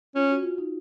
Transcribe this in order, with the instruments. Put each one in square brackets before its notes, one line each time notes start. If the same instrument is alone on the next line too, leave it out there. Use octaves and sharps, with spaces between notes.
[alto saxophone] C#4 [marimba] F4
[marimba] F#4
F4
D#4